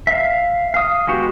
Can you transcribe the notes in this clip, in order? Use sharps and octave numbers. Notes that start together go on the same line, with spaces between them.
E5 F5
F5 D#6
G#3 B3 F#4 G4